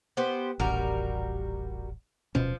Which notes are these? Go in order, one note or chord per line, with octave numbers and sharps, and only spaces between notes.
B3 G4 C5
D#1 A1 G3 F#4 A#4
D1 B2 F3 C#4